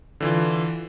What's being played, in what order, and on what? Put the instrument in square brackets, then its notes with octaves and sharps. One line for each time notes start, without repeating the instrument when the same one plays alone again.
[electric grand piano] D3 E3 F4